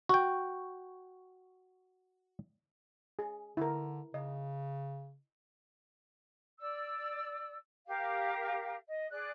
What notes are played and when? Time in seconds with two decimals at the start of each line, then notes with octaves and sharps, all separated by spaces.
0.09 F#4 G5 C#6
3.19 G#4
3.57 D3 E4 A#4
4.14 C#3 D#5
6.60 D5 E6
7.87 G4 A#4 F5
8.87 D#5
9.11 G#4 D5 F#6